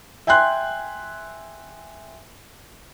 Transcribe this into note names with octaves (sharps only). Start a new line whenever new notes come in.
E5 G5 G#5 C6 F#6